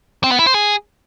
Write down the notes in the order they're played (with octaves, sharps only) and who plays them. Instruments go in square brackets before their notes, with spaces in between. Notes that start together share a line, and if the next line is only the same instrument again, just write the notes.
[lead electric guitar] C4
B3
E4
C5
G#4